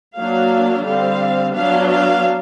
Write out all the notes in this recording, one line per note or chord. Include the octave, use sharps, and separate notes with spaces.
F#3 A#3 D4 F5
D3 G3 C4 F5
F#3 B3 D4 F5
F5